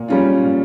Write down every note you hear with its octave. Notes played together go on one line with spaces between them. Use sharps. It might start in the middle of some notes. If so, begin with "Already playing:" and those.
Already playing: A#2
G3 C#4 F4
A#2